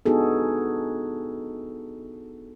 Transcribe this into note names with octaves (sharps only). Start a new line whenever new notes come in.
B3 D4 D#4 F#4 G#4 A4